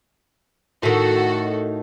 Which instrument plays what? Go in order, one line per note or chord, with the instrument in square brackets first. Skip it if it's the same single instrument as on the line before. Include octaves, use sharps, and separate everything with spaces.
[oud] A2 D#3 [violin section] F#4 A4